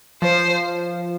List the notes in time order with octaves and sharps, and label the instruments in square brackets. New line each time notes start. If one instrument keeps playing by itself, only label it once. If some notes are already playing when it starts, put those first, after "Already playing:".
[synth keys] F3 [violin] C5